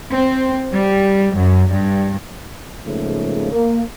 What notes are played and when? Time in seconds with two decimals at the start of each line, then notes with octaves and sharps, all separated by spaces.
0.12 C4
0.73 G3
1.37 F#2
1.72 G2
2.85 G#2 C#3 F3 A3 A#3
3.52 A#3